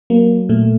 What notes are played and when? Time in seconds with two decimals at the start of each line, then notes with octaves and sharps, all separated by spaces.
0.10 F#3 A#3
0.49 A#2 A3